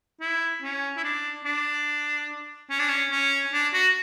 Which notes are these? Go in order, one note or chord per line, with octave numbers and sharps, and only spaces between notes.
E4
C#4
E4
D4
D4
C#4
D4
C#4
C#4
D4
F#4